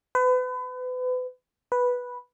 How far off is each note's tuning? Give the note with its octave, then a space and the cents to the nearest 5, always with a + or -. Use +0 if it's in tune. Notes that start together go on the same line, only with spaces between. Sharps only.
B4 +35
B4 -5